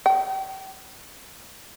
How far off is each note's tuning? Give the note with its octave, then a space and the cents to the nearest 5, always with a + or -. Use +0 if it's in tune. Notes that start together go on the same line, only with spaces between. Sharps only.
G5 -35